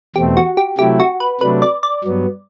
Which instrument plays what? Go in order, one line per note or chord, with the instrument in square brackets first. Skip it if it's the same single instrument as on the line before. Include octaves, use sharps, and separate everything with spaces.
[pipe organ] E2 B2 A3 C4 [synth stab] G4
[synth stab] F#4
G4
[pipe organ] C3 F#3 A3 E4 [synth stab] G4
[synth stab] F#4
B4
[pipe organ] C3 F#3 A3 D4 [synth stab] B4
[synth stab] D5
D5
[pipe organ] G2 F#3 B3